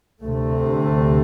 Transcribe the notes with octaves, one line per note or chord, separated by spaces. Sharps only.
D2 C3 A3